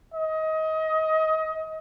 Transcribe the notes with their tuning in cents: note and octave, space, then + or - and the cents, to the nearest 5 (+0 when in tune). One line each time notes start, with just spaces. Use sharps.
D#5 +25